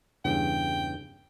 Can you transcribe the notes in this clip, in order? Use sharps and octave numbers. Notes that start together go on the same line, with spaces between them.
E2 G2 C#3 G5